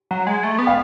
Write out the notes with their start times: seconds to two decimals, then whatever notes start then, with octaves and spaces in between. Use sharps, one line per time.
0.11 F#3
0.27 G#3
0.43 A3
0.58 B3
0.67 F5